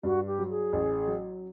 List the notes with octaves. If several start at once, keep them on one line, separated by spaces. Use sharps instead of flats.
G2 F#4
G4
F#3
G#4
A1
F#3